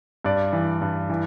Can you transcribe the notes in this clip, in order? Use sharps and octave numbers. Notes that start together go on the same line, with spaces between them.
G2 D5
E3
G2
E3